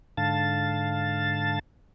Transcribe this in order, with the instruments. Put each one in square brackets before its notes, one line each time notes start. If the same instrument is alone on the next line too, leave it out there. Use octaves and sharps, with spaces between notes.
[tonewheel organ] G#2 D3 F5 A5 A6